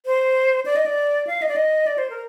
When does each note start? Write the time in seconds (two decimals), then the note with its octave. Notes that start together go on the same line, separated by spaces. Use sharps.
0.06 C5
0.66 D5
0.76 D#5
0.86 D5
1.27 F5
1.42 D#5
1.49 D5
1.56 D#5
1.87 D5
1.98 C5
2.10 A#4